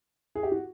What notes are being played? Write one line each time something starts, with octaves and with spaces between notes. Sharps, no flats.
G#4
G4
F#4